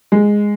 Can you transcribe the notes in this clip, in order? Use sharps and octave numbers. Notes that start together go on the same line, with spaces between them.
G#3